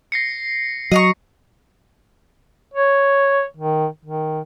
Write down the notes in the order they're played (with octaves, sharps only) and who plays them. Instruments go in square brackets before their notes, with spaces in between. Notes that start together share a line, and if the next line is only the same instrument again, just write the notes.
[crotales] A#6 C7 C#7
[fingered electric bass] F#3 [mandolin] D#5 A#5 C#6
[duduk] C#5
D#3
D#3